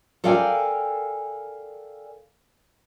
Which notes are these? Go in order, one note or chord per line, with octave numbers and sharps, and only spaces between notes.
A4 A#4 D5 F5 G5 G#5